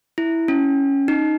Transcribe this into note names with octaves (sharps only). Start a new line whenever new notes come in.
E4
C#4
D#4